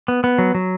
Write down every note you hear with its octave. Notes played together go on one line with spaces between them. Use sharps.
B3
B3
F#3
F#3